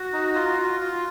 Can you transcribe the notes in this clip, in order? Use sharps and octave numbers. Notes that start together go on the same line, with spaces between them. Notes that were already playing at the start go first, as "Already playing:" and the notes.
Already playing: F#4
D#4
F4
F4
F4